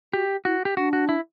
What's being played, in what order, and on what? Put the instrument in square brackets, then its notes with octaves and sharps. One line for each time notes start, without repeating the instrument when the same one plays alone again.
[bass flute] F#4 [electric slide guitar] G4
[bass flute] E4 [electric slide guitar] F#4
[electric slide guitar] G4
[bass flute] D4 [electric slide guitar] F#4
[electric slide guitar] F#4
E4